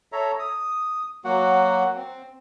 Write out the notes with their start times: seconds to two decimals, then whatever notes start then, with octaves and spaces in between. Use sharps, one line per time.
0.12 A4 C#5 E5 A#5
0.39 D#6
1.24 F#3 A#3 F#4 F#5
1.96 C4